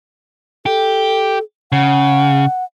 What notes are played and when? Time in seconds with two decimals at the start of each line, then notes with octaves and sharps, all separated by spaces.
0.66 G4 A4
1.72 C#3 F#5